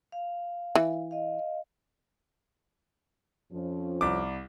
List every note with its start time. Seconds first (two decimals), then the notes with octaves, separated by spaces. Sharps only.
0.12 F5
0.75 E3
1.11 D#5 F5
3.52 F2 F3 C#4
4.01 C2 D6